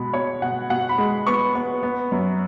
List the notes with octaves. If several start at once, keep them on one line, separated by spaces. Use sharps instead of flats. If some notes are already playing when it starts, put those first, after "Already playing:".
Already playing: B2 G#3 B5
B2 C#5
B2 F#5
B2 F#5
B5
G#3
B3 C#6
B3
B3
F#2